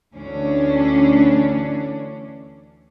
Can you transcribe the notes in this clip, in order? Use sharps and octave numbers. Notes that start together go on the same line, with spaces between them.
D2 E3 C#4 D4